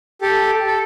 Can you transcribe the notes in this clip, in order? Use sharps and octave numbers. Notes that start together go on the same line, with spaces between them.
G4 A4
A4